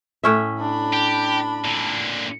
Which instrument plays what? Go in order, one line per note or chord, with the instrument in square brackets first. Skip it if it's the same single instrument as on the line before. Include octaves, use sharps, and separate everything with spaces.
[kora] A2 C#4 E5
[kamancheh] D4 B5
[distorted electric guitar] G4
A#2 D3